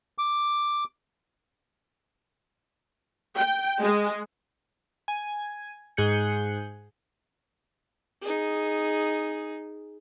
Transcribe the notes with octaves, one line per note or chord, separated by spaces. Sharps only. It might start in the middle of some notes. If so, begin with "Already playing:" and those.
D6
G5
G#3
G#5
G#2 G#4 F#6 G6 C#7
D#4 G#4